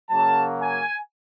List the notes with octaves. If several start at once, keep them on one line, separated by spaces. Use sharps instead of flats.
C#3 F#3 A#3 A5
G#5